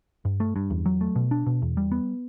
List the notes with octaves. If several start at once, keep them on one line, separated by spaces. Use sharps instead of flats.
G2
A3
G2
E2
F#3
A3
B2
D4
B2
E2
G3
B3